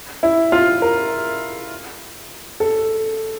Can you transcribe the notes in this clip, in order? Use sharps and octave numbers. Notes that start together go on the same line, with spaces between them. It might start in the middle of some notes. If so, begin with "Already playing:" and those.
E4
F4
A#4
A4